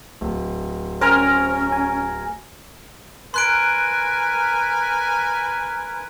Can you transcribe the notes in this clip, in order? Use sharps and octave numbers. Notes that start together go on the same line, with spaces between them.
D1
C#4 A#4 C5 G#5 F6
G#5
A#4 B4 G#5 C6 F#6 D7